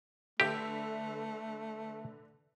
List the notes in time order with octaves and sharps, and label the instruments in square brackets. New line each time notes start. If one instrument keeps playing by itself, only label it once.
[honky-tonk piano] D3 B4 E5 [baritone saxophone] A3 [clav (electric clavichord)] G4